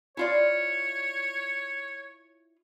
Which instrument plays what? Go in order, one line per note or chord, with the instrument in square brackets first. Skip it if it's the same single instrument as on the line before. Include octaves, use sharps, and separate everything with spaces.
[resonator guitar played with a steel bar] E4 F4 D5 [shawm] C#5